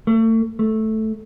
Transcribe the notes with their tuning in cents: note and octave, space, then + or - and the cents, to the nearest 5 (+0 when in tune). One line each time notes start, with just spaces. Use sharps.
A3 +35
A3 -5